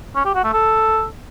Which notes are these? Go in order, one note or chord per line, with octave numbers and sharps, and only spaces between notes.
C#4
G4
F#4
A3
A4